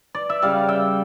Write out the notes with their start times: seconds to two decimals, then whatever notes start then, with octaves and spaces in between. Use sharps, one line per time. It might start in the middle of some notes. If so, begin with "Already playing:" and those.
0.14 D5
0.29 E5
0.42 C#3 G3 D5 F5
0.68 E5 G5